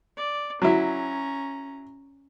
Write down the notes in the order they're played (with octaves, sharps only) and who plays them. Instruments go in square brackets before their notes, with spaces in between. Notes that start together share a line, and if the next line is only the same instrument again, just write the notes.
[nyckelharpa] D5
[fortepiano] F#3 E4 [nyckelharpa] C#4 A#5